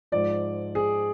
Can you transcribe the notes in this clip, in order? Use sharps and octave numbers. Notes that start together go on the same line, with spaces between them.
G#2 F3 D5
G#4